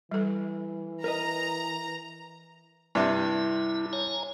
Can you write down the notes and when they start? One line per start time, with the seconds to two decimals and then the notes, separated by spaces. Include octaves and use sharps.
0.11 E3 G3 A4
1.04 A#4 B4 D#5 A#5
2.95 G2 C3 E4
3.93 C#5 G#5 A#5